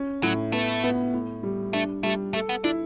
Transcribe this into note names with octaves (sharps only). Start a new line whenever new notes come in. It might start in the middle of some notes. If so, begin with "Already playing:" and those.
Already playing: C#4
A2 F#3
A3 B3
B3
A2
G3
A3 D4
G3 A3
A3 A4
B3
D4 E4